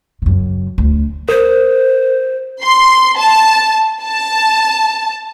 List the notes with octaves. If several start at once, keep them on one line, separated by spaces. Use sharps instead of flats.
F#2 C#3
D2
A#4 C5
C6
A5
A5